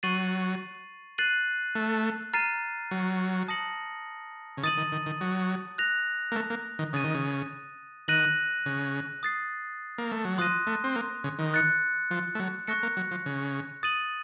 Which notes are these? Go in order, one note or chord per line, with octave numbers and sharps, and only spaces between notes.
F#3 C#6 A6 C7 D#7 F#7
F#6 A6 C7 D#7 F#7
A3
A#5 F6 A6 C7 D#7
F#3
A5 D#6 A#6 C#7 F#7
C#3
D#3 D#6 A6 D#7 F#7
D#3
D#3
D#3
F#3
F#6 A#6 F7
A#3
A3
A#3
D#3
C#3 D#6 A6 D#7
D#3
C#3
D#3 F#6 A#6 D#7 F#7
C#3
D#6 A6 C7
A#3
A3
F#3
F3 C6 D#6 F#6 A#6 D#7
A3
C4
A#3
C#3
D#3
F#6 A6 C#7
F3
A3
F#3
A3 C#6 F#6 A#6 C#7
A#3
F#3
F3
C#3
D#6 A6 D#7 F#7